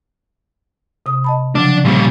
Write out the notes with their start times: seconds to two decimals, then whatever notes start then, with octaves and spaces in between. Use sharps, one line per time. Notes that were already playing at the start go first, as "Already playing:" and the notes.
1.06 C3 D#6
1.24 D#5 A5 B5
1.55 C#3 F3 F#3 D4
1.85 A#2 G3